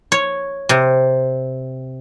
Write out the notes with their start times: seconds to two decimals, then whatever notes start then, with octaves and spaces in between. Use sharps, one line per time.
0.12 C#5
0.69 C3